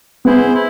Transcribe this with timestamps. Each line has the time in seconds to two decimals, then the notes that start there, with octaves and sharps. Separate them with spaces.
0.25 B3 E4 G#4 C5
0.54 E4